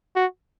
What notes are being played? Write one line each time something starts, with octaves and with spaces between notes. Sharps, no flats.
F#4